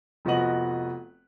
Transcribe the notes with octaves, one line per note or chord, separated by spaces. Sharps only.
F1 F3 B3 F#4 D#5 F#7